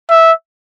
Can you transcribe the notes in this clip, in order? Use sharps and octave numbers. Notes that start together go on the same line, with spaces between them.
E5